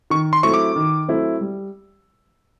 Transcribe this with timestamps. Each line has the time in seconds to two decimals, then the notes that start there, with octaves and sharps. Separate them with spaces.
0.10 D#3 C#6
0.33 C6
0.43 F#3 A3 C4 E4 C#6
0.54 D6
0.76 D#3
1.08 F#3 A3 C4 E4
1.41 G3